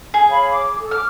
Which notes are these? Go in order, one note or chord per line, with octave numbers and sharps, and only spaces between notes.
G#4
C#5 F5 B5
D6
A4
D6 F6